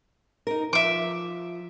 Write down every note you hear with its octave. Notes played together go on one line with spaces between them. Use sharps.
D#4 A#4
F3 E5 D6